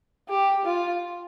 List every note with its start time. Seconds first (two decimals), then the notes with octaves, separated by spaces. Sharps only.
0.29 G4
0.65 F4